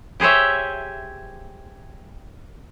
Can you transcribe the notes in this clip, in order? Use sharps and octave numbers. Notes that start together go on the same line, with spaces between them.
G4 G#4 C5 C#5 E5